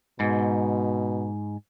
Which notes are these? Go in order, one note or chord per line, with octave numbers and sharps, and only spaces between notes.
G#2 B2